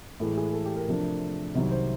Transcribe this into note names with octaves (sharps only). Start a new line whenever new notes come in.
A2 E3 G#3 A4
G#4
A4
G4
A#4
C3 F3 A3 D4
C2 C3 D#3 F#3
C5